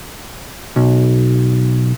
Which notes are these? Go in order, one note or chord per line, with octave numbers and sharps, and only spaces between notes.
B1